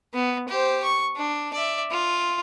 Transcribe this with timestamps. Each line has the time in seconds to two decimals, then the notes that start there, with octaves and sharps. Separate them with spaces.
0.14 B3
0.49 G4 C5
0.83 C#6
1.16 D4
1.54 D5 E5
1.91 F4